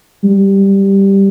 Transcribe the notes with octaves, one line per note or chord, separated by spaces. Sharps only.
G3